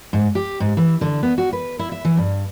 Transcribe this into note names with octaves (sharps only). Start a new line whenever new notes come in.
G#2
G4
G#2
E3
D3
B3
F#4
B4
E4
E5
E3
G2